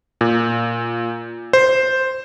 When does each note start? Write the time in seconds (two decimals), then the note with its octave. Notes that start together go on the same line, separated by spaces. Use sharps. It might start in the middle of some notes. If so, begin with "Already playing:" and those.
0.21 A#2
1.53 C5